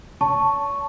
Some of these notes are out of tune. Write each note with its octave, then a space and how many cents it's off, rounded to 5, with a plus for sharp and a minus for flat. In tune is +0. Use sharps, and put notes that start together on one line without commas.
C#5 +40 A5 +0 C#6 +0